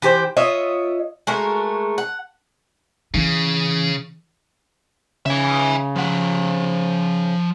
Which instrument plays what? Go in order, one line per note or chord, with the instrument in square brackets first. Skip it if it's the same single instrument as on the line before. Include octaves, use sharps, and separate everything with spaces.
[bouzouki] E3 G4 A#4 C5
F4 C#5 D#5 E5
G#3 A3 F#4 A#4
F#5
[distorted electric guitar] C#3 [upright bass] E3
[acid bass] C#3 [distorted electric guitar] E5 G#5
[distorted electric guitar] F3 F#5